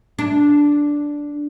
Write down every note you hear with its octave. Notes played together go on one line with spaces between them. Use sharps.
D4